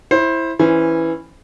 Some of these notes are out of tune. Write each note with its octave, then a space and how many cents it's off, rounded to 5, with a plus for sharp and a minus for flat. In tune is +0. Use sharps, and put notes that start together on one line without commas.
E4 +0 C5 +20
E3 +0 C#4 +0 C5 +0